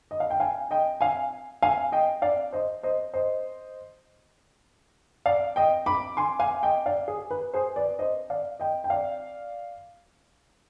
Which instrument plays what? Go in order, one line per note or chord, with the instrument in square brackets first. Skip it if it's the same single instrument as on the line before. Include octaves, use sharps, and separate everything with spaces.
[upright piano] D#5
F5
G5
F5 G#5
D#5 G5
F5 G#5
F5 G#5
D#5 G5
D5 F5
C5 D#5
C5 D#5
C5 D#5
D5 F5
D#5 G5
B5 D6
G#5 C6
F5 G#5
D#5 G5
D5 F5
G#4
B4
G#4 C5
B4 D5
C5 D#5
D5 F5
D#5 G5
G5
D5 F5